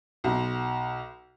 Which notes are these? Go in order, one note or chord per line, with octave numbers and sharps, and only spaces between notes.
B1